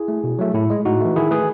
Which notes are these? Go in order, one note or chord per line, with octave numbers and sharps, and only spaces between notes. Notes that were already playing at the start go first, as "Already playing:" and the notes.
Already playing: E4 G#4
A3
B2
F#3 A3
A2 E4
G#3
A2 D#4 F#4
E3 A3
D#3 E4 G#4
A3 G#4 B4